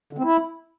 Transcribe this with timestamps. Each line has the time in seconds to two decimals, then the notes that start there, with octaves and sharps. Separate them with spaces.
0.13 D3
0.18 C4
0.24 E4